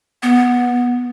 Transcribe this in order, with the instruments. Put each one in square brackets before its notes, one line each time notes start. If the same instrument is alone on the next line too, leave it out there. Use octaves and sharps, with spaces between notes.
[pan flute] B3